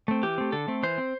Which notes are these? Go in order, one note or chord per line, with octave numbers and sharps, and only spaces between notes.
A3 C4
E3 G4
A3 C4
D3 A4
A3 C4
E3 C5
C4